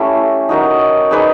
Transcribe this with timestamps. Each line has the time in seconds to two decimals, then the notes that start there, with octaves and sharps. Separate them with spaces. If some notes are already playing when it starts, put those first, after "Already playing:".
Already playing: A3 C#4 E4 G4
0.49 D#4 F#4 A#4 D#5
1.11 D#4 G#4 B4 D5